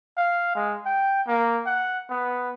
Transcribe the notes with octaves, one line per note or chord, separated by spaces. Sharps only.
F5
G#3
G5
A#3
F#5
B3